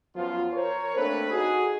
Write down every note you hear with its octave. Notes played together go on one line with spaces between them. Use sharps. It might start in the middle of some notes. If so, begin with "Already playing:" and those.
F#2 F3 B3 F4
A#4 C5 C#5
A3 A#3 C4 D4 A4 B4
D#4 F#4 G#4